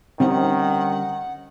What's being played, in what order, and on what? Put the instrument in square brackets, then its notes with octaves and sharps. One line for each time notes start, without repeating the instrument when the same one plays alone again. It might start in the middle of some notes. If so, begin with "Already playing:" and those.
[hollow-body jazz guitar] D3 G3 C#4 [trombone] D#3 [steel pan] C4 D#4 [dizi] F#5